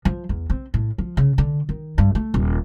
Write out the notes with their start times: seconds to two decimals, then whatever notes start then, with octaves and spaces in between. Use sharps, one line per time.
0.05 F3
0.29 E2
0.50 C4
0.74 A2
0.98 F3
1.17 C#3
1.38 D3
1.69 D#3
1.98 G2
2.15 A3
2.34 D#1